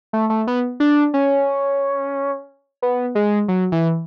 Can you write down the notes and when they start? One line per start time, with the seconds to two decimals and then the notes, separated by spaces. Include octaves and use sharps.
0.13 A3
0.30 A3
0.47 B3
0.80 D4
1.14 C#4
2.82 B3
3.15 G#3
3.48 F#3
3.72 E3